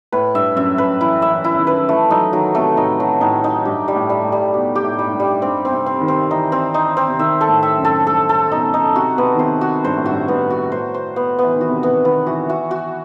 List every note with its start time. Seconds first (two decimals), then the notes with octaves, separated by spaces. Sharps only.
0.12 A2 B4
0.35 G2 E5
0.56 F#2 E5
0.78 F#2 B4
1.01 E3 E4
1.22 E5
1.30 E3
1.44 E4
1.54 E3
1.59 D#3
1.67 B4
1.89 E3 A3
2.11 F#3 D#4
2.33 D#3 F#3
2.55 C3 A3
2.77 A2 D#4
3.00 F#3
3.21 A2 D#4
3.44 D#4
3.65 G2 G4
3.88 G3
3.95 A2
4.09 G3
4.24 A2
4.32 G3
4.54 B2 G4
4.75 G4
4.83 A2
4.99 G3
5.07 A2
5.13 G2
5.20 G3
5.42 G2 C4
5.65 C4
5.72 C3
5.86 C4
6.01 D#3
6.08 C4
6.31 E3 D#4
6.52 C4
6.74 D#4
6.97 C4
7.08 C3
7.19 D#3 E5
7.41 A4
7.48 A2
7.63 E5
7.78 F#2
7.85 A4
8.07 G2 A4
8.29 A4
8.52 B2 D#4
8.74 D#4
8.95 C3 F#4
9.18 C3 B3
9.35 D#3
9.39 C3 C5
9.61 F#4
9.84 G2 C5
9.97 A2
10.06 F#4
10.11 G2
10.28 G2 B3
10.50 F#4
10.66 B2
10.72 A2 C5
10.94 C5
11.16 B3
11.39 E3 B3
11.56 D#3
11.61 F#4
11.69 C3
11.83 B2 B3
12.04 D#3 B3
12.27 E3 F#4
12.49 E3 F#4
12.71 F#4